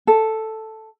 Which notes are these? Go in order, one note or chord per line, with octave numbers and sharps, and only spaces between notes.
A4